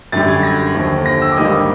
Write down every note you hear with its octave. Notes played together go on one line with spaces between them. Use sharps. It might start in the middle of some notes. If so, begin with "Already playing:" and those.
F#2 D3 G3 A6
G#6
A#6
D#2 D3 F3
A#6
E6
D6
A#1 G#2 D#3 G3 A#3 D#6
D6